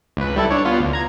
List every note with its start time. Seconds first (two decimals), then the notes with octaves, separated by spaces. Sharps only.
0.17 C#2 B4
0.36 G3 E4 A4
0.51 D4 C#5
0.65 B3 F4
0.79 D2
0.93 A#5 G#6